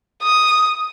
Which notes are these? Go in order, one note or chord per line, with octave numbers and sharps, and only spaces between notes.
D#6